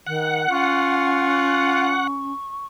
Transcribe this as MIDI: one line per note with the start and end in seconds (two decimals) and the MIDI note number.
0.07 0.47 51
0.07 2.07 78
0.50 2.33 61
0.50 1.96 65
0.50 2.65 85